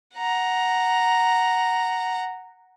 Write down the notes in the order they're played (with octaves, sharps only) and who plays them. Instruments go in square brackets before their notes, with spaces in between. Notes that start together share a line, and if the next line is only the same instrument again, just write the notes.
[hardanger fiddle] F#5 A#5